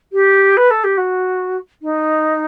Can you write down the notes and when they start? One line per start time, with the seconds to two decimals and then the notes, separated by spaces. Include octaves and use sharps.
0.13 G4
0.57 B4
0.71 A4
0.84 G4
0.97 F#4
1.82 D#4